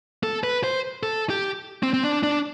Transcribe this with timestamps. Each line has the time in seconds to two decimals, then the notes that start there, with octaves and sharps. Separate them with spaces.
0.23 A4
0.44 B4
0.64 C5
1.03 A4
1.30 G4
1.83 C4
1.93 C4
2.03 D4
2.23 D4